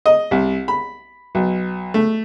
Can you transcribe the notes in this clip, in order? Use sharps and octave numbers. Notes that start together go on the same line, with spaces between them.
D#5
C2
B5
B1
A3